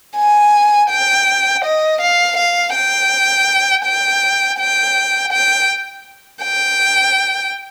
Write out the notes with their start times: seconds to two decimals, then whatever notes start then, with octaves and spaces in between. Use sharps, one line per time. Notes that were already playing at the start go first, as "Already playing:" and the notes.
0.16 G#5
0.90 G5
1.64 D#5
2.01 F5
2.37 F5
2.75 G5
3.85 G5
4.59 G5
5.32 G5
6.43 G5